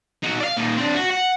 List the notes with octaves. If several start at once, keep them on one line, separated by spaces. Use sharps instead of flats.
D#4 F#4
D5 F5
A#2 D#4
C4 D4
F#4
F#5